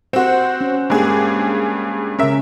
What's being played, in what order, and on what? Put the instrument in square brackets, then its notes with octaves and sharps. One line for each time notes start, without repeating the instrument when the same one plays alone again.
[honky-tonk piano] C4 F#4 [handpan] C5 F#5
[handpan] C#4
[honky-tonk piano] G2 G#4 [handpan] G#3 A#3 G4
[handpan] C#3 C#4 [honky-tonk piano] A#4 E5